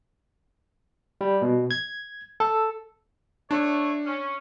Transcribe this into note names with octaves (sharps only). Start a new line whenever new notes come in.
G3
B2
G#6
A4
A3 D4 C#5
C#4